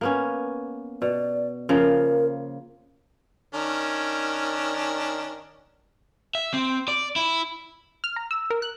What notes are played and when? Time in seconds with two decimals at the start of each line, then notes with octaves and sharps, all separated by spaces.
0.01 A#3 B3 C#4
1.02 B2 D5
1.69 C#3 F3 A#3 A#4
3.54 D#3 C#4 D4
6.35 E5
6.54 C4
6.88 D5
7.16 E4
8.04 F6
8.16 A#5
8.31 E6
8.50 A#4
8.62 F#6